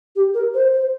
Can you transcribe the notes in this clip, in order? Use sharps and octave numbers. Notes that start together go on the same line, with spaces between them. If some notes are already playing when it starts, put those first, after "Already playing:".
G4
A#4
C5
C5